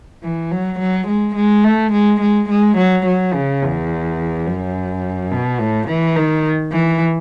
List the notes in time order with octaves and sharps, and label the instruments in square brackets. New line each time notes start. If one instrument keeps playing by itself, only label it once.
[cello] E3
F#3
F#3
G#3
G#3
A3
G#3
G#3
G#3
F#3
F#3
C#3
E2
F#2
B2
A2
E3
D#3
E3